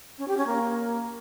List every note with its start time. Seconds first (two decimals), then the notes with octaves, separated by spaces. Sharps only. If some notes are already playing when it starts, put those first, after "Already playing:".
0.18 C#4
0.28 G4
0.37 C#4
0.47 A#3